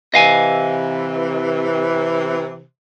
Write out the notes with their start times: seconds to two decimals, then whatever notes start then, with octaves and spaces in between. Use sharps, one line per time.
0.14 C3 E3 D#5 F5 G#5